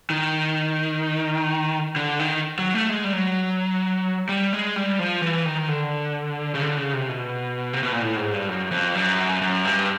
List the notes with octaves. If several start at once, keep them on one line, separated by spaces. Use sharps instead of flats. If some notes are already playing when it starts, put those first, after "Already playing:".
D#3
D3
D#3
F#3
A3
G#3
G3
F#3
G3
G#3
G3
F3
E3
D#3
D3
C#3
D3
C#3
C3
B2
C3
B2
A#2
A2
G#2
G2
F#2
F2
F#2
F#2
G2